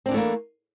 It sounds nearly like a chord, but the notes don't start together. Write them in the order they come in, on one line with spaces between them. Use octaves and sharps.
C4 D4 E3 A3 A#3